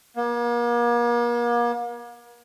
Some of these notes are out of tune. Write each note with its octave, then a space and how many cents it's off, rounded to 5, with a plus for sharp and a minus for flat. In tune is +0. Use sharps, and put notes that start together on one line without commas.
A#3 +40